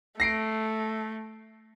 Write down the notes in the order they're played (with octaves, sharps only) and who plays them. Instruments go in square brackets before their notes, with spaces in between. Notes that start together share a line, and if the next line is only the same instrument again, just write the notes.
[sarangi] A3 [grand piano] A#6 C7 D7